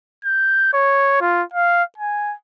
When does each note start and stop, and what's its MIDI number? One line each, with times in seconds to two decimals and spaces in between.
0.24 0.69 91
0.73 1.17 73
1.21 1.43 65
1.54 1.83 77
1.98 2.35 80